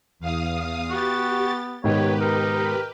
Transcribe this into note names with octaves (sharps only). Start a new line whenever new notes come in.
E2 F5 D#6
B3 F#4 G4 A6
G#2 B2 D#3 G4 B4 C#5
D#4 A#4